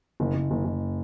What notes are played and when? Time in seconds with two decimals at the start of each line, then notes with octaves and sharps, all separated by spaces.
0.20 F#1
0.34 F#1
0.51 F#1
0.65 F#1